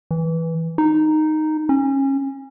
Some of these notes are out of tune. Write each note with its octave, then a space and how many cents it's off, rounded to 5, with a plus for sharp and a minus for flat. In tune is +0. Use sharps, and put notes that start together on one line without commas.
E3 -5
D#4 -5
C#4 -25